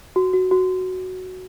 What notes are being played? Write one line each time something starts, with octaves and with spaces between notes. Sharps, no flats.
F#4
F#4
F#4